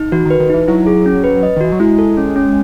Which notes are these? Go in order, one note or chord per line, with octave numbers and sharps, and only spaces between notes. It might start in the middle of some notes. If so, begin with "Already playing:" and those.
Already playing: D#4
E3 F#4
D#3
B4
D#3
E3 D#4
F#3 E4
G#4
C#4
B4
D#5
D#3
E3 F#4
F#3
G#3 E4
A4
C#4
C#4